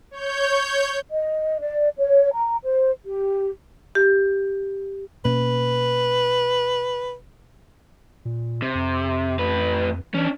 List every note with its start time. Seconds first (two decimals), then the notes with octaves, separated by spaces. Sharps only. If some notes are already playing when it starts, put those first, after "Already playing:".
0.11 C#5 G6
1.10 D#5
1.60 D5
1.98 C#5
2.32 A#5
2.62 C5
3.05 G4
3.95 G4
5.25 B2 A#3 C#4 B4
8.25 A#2
8.62 C3
8.75 F2
9.39 A2 B4
10.14 E3 C#4 D4